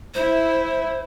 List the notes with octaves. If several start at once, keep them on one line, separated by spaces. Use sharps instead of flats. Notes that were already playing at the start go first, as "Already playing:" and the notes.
E4 C5